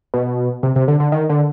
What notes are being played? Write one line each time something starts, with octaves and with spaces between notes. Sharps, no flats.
B2
C3
C3
D3
D3
D#3
D3